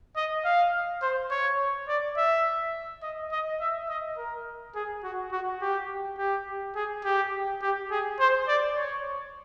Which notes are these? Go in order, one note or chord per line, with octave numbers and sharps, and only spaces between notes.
D#5
F5
C5
C#5
D5
E5
D#5
D#5
E5
D#5
A#4
G#4
F#4
F#4
G4
G4
G#4
G4
G4
G#4
C5
D5
C#5